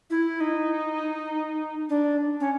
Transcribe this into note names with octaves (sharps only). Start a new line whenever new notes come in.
E4
D#4
D4
C#4